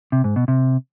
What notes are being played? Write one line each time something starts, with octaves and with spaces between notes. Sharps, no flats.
C3
G#2
B2
C3